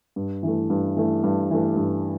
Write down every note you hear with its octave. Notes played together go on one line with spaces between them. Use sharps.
G2
E3 A3
G2
E3 A3
G2
E3 A3
G2